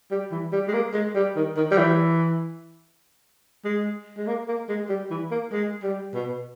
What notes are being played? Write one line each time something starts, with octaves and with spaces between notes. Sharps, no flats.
G3
E3
G3
G#3
A#3
G#3
G3
D#3
D#3
G3
E3
G#3
G#3
A#3
A#3
G#3
G3
E3
A#3
G#3
G3
B2